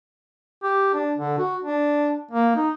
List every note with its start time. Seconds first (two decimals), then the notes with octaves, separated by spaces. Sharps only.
0.63 G4
0.94 D4
1.18 D3
1.38 F#4
1.62 D4
2.31 A#3
2.56 D#4